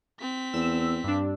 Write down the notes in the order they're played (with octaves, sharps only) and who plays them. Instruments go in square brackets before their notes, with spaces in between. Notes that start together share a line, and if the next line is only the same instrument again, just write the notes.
[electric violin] C4 B6
[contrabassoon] E2 [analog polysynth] E6
[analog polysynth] G2 D4